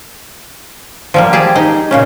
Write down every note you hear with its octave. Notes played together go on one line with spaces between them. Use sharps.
F3 G3 A#3
G4 G#4 A5
D#4
A#2 C#3 C#4